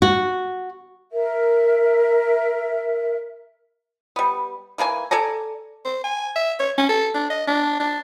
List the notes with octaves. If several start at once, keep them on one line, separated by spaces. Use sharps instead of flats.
F#4
A#4 E5
G3 B3
E3 A#3 A#4 G#5
A4 D5 G#5 A#5
C5
G#5
E5
C#5
C#4
A4
D4
D#5
D4
D4